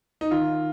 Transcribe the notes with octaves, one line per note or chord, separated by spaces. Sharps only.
D#4
D#3 F4